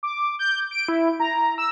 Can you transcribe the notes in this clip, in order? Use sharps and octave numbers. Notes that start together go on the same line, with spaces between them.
D6
G6
D7
E4
A#5
E6